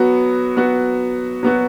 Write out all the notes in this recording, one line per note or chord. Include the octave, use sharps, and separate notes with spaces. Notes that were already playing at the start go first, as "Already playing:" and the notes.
Already playing: F#3 B3 F#4
F#3 B3 F#4
F#3 B3 F#4